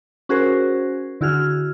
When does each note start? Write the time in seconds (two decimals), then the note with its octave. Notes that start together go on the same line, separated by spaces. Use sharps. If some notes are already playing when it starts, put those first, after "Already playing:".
0.29 C#4 F#4 G#4 A#4 C5
1.21 D3 E4 F#4 G#4 F6